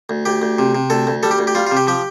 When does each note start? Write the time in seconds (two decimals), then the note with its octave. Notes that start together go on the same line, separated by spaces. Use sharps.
0.09 D2
0.25 D2 G4
0.42 D2
0.59 C3
0.75 C3
0.90 D2 A4
1.07 D2
1.23 G3 A4
1.31 G4
1.39 D2
1.47 G4
1.55 G3 F4
1.67 F4
1.72 C3
1.77 G4
1.87 F3 G4